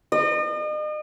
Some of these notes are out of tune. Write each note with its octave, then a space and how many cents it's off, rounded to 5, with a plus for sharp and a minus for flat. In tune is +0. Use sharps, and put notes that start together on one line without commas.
D#5 -40